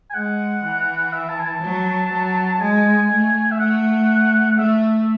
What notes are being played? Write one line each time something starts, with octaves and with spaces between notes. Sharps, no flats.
G#5
G#3 F#5
E3
E5
A5
G#5
A5
F#3
F#3
A5
G#3 G#5
A3
E5
A3 F#5
A3 E5